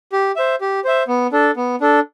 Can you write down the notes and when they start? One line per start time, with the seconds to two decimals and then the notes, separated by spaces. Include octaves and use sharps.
0.12 G4
0.36 C5 E5
0.61 G4
0.84 C5 E5
1.08 B3
1.32 D4 A4
1.56 B3
1.81 D4 A4